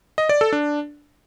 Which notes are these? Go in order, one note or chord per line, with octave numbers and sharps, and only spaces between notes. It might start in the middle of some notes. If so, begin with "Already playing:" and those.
D#5
D5
A4
D4